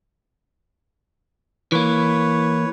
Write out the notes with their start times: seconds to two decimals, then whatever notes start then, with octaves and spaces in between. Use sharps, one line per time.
1.72 E3 A#3 B4 C#5